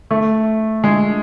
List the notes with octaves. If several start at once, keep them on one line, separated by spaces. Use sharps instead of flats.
A3
G#3